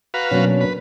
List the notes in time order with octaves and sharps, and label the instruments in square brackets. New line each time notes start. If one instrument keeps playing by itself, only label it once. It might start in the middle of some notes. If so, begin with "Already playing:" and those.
[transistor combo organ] F#4 B4 F5 [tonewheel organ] A#5
[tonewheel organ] B2 C#4 [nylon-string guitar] F#3 A#3 D4
[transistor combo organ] B4